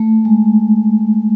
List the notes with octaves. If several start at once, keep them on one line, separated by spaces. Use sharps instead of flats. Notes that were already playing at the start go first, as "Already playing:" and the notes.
Already playing: A3
G#3